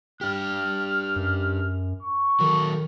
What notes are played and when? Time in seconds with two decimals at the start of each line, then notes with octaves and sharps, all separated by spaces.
0.21 D4 G4 F6
1.16 F#2
2.03 C#6
2.40 D#3 F#3 A4